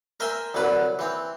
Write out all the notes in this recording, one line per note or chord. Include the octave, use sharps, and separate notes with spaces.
A#4 C5 E5 G5 G#5 C6
C2 D3 F#3 B4 B5
E3 C4